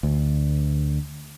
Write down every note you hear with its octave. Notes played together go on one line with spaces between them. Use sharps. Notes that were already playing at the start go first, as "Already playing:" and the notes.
D2